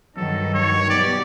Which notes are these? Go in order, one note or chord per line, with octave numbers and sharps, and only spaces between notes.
G2 D#3 F#3 A4
C#5
B2 F#3 B3 D#4 G4 D5